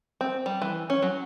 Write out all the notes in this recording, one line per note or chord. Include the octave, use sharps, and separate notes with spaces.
C4
G3
E3
C#4
F#3